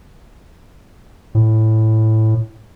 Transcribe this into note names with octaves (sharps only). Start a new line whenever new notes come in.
A2